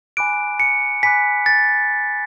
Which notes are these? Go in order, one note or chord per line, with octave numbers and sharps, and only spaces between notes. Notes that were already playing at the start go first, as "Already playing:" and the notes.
G#5 B5 D6 F#6 D7
C#7
G#5 B5 D6 F#6 B6
A6